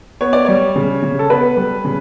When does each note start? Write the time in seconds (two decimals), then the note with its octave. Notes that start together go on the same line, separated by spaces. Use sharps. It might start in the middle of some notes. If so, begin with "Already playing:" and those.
0.21 B3 C#5
0.33 D5
0.45 G3 C#5
0.76 C#3
1.02 C#3
1.19 A4
1.30 B3 B4
1.57 G3
1.84 C#3